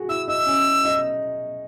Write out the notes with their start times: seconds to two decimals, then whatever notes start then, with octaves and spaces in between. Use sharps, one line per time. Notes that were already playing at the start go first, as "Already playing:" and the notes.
Already playing: F#4 G#4
0.09 E4 E6
0.28 D#4 E6
0.46 C#4
0.85 D#4